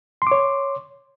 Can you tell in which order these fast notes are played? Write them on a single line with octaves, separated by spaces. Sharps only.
C6 D6 C#5